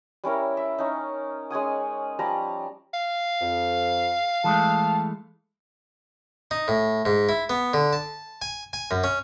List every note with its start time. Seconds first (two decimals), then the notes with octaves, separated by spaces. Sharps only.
0.24 G3 C#4 E4 A#4
0.57 E5
0.78 C#4 D#4
1.50 G#3 C#4 G#5 D#6
2.19 F3 G3 A5 A#5
2.94 F5
3.42 F2
4.44 E3 G#3 A3 A5
6.51 D#4
6.68 A2
7.05 G#2
7.29 E4
7.50 B3
7.74 D3
7.93 A5
8.42 G#5
8.73 G#5
8.91 F#2
9.04 C#4